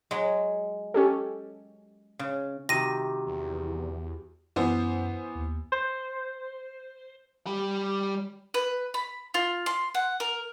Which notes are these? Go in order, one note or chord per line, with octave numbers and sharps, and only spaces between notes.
F#3 G#3
C#4 G4 A4
C#3
C3 D#3 F#4 G4 A#6 D#7
E2
F#2 E3 B3 C5
D#2
C5
G3 B5
B4
B5
F4
C6
F#5
A#4